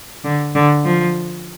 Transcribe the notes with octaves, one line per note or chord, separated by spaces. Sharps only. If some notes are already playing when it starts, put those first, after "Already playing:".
D3
D3
F3